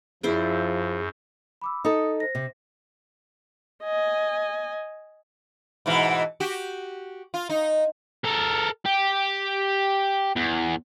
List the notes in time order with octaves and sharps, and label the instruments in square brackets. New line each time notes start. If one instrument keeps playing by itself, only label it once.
[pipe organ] F#2 [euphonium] F3 [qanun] E4 C5 D5 [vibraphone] G#4
[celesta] B5 D6 E6
[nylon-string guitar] D#4 A4 [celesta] D#6
[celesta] C5 A#6
[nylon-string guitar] C3
[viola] D#5 G#5
[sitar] G#2 B2 E3
F#4 G4
F4
D#4
[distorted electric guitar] A4 A#4
G4
E2